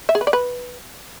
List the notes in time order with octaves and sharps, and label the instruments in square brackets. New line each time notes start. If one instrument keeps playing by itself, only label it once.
[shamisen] E5
G#4
B4
D5
B4